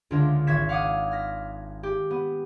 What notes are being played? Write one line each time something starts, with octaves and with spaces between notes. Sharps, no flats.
C#2 D3 D4 F4 A#4 E5
G#1 E5 C#6 G#6 B6 E7
F5 F#5 D6 D#6
F6 A#6 B6
G4
B3